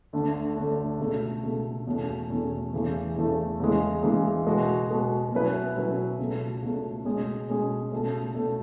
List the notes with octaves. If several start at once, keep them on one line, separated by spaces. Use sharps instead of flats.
D2 D3 A3 D4
D2 D3 A3 D4
C#2 B2 A3
C#2 B2 A3
E2 B2 A3 C#4
E2 B2 A3 C#4
E2 C#3 E3 A3
E2 C#3 E3 A3
E2 C#3 E3 G#3
E2 C#3 E3 G#3
B2 G#3 B3 F#4
B2 G#3 B3 F#4
B2 F#3 C#4 E4 B4
B2 F#3 C#4 E4 B4
C#2 B2 A3
C#2 B2 A3
B2 G#3 C#4 G#4
B2 G#3 C#4 G#4
C#2 B2 A3
B2 A3